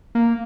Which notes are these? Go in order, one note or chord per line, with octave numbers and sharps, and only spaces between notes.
A#3